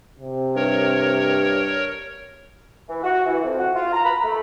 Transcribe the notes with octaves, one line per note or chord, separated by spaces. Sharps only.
C3
G2 A#4 C#5
E3
F#4
E3
F2
F#4
F4
A#5
B5
A3